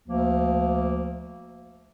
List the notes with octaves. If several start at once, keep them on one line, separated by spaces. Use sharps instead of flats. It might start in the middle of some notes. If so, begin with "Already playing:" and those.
D2 F3 A#3